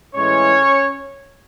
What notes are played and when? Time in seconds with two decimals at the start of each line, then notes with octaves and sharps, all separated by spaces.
0.15 A2 E3 G#3 C#4 C#5